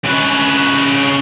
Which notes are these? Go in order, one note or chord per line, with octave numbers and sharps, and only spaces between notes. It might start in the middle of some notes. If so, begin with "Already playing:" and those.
C#3 B4